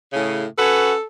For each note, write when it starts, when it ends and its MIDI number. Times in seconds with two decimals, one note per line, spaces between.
0.13 0.44 45
0.13 0.44 49
0.58 0.93 61
0.58 0.93 66
0.58 1.05 69
0.58 0.93 71